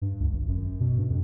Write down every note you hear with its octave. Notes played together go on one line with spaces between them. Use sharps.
G2
C#2
G#1
F#2
B2
G2
F2